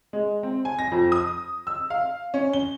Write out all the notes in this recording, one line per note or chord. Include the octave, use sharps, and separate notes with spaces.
G#3
C4
G#5
A#6
F2
D#6
E6
F5
C#4
G7